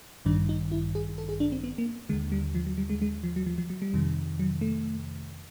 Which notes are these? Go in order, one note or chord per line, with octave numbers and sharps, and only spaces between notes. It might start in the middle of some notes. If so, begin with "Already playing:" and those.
A1 G2 D#3 D4
D#4
E4
G#4
A4
G#4
D4
C4
B3
A#3
D#2 D3 G#3
G3
F3
F#3
G3
G#3
G#3
F3
F#3
F3
F3
F#3
G3
F2 C3 D#3
F#3
A3